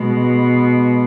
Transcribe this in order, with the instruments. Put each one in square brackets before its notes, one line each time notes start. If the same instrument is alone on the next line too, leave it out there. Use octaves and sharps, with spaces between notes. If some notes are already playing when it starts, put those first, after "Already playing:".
Already playing: [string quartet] B2 G#3